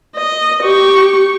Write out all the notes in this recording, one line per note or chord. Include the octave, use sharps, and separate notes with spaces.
D#5
G4 C#6